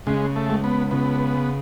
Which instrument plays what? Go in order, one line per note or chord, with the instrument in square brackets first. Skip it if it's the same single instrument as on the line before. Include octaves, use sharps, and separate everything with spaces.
[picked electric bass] C#3 [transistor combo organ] G#3
[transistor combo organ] A3
[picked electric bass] G#3
[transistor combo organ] B3
[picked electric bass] C#3 [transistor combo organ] B3